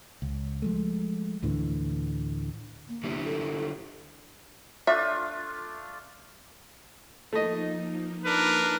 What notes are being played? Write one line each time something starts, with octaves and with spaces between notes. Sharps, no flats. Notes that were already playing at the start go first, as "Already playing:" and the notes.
C#2
F3 G#3 A3
D2 A2 D3 E3
A#3
D3 G3 E4
A4
A3 D4 F4 E5
F3 A3 A#3 D#4 D#5
D4 A#4 B4